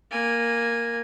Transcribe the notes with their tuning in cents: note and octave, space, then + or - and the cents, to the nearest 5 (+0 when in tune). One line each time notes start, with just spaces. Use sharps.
A#3 +0 G#5 -15